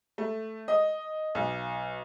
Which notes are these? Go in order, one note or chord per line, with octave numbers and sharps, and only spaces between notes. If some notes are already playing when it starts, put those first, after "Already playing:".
A3
D#5
B1